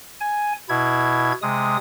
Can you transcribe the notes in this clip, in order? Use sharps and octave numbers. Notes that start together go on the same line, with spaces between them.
G#5
B2 E4 G#6
C3 G#3 D#6